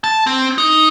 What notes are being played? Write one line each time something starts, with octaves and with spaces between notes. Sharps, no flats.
A5
C4
D#4